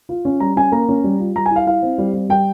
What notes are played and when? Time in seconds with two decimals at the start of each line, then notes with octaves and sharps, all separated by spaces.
0.09 F4
0.25 C#4
0.40 G3 A#5
0.57 C#4 G#5
0.72 A#3 A#5
0.89 C#4
1.04 G3
1.20 F4
1.35 G3 A#5
1.46 G#5
1.51 E4
1.56 F5
1.66 E4 F5
1.82 C4
1.98 G3
2.14 G3
2.29 G3 G5